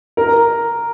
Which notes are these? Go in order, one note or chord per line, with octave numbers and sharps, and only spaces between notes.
A#4